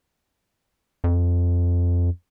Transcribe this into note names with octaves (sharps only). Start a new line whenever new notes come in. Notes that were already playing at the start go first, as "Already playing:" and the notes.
F2